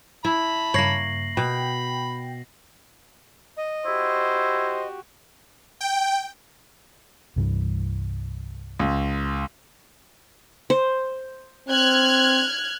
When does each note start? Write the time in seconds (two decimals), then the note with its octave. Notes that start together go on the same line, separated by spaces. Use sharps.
0.25 E4 A5 B5
0.74 G2 C#3 A#3 C#5 A#6 C7 F#7
1.37 B2 G5 B5
3.57 D#5
3.86 E4 F#4 G4 C5
5.81 G5
7.36 C2 G2 E3
8.79 C#2
10.70 C5
11.68 C4 F6 F#6 G#6